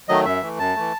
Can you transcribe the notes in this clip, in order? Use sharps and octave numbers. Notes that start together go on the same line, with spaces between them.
D#3 F#3 A3 D#5
F#2 E5
E3 A3
F#2 A5
E3 A3